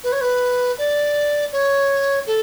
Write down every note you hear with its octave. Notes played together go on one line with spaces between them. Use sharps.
B4
C#5
B4
D5
C#5
A4